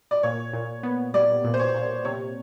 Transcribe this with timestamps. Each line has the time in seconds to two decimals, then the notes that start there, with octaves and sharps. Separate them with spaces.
0.11 D5
0.23 A#2 C#5
0.53 A#2
0.83 B3
1.14 G3 D5
1.44 A#2
1.54 C5
1.60 C#5
1.75 A#2
2.05 C3 C#5